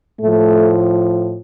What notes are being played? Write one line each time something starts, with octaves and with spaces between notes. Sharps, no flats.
A2 F3 A3